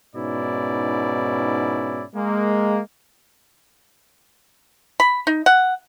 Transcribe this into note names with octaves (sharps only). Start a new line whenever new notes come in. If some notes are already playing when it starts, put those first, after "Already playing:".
G#2 B2 C#4 D#4 E4 D5
G#3 A#3
B5
D#4
F#5